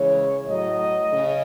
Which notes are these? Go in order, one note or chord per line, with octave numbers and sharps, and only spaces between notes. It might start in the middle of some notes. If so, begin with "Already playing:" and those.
Already playing: C#3 E3 G#3 C#5
A2 F#3 D#5
C#3